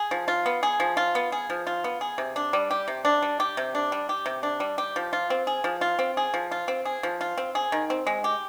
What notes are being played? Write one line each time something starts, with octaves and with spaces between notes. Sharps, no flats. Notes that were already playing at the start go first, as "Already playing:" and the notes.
Already playing: G#4
F3
F4
B3
G#4
F3
F4
B3
G#4
F3
F4
B3
G#4
C3
D4
G3
G4
C3
D4
G3
G4
C3
D4
G3
G4
C3
D4
G3
G4
F3
F4
C4
G#4
F3
F4
C4
G#4
F3
F4
C4
G#4
F3
F4
C4
G#4
D#3
C4
G#3
G4